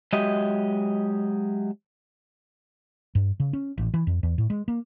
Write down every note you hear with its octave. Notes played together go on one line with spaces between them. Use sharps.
F#3 G#3 G4 D#5 E5
G2
C#3
C#4
A1
E3
F2
E2
A2
G#3
A#3